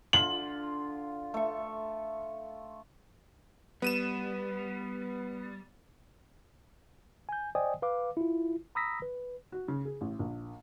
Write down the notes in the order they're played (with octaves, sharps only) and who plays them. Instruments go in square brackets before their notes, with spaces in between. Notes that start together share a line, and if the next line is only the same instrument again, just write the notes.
[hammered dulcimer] D3 F4 [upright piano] F#7
[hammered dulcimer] A3 C#6
[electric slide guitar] G3 [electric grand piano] B3 D#7 E7
[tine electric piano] G#5 G6
C5 D5 D#5 G5 G#5 D#6
B4 F5 D6
E4 F4
A#5 B5 D#6 E6 A#6 B6
B4
[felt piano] F#4
C#3
G#4
A1
A#1